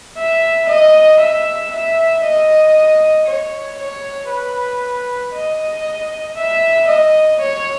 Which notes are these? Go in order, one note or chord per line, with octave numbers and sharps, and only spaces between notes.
E5
D#5
E5
E5
D#5
C#5
C#5
B4
D#5
E5
D#5
C#5